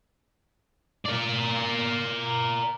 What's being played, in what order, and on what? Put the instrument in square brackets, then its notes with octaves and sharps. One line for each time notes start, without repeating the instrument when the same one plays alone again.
[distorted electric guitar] A#4 D5